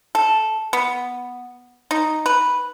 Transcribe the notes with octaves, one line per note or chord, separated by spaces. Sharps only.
A4
B3
D#4
B4